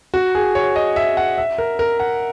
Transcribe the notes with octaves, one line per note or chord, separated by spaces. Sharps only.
F#4
G#4
C#5
D#5
E5
F#5
E5
A#4
A#4
F#5